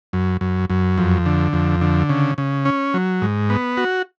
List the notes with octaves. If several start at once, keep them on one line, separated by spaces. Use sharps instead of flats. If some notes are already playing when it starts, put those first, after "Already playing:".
F#2
F#2
F#2
F2
D3
F2
D3
C#3
C#3
C#4
F#3
G#2
B3
F#4